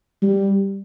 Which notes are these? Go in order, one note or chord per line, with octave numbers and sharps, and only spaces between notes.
G3